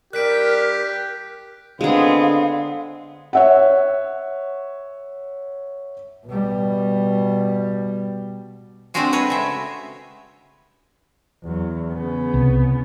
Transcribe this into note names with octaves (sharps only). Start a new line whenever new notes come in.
G3 D4 E4 G4 A#4 F#6 B6 D7
D3 G#3 B3 C4 G#4 F5
C#5 E5 F#5
B2 G3
G#3 A3 C4 D4 F#4 G#4
B4 C#5 D#5
C#3 E5
E2 F#3
C#3 B3
C2